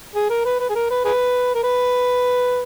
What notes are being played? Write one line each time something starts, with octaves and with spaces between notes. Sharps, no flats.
G#4
A#4
B4
B4
G#4
A#4
B4
G#4 B4
A#4
B4